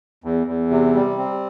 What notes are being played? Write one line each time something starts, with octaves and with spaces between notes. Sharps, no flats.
E2
E2
C3
G3
C4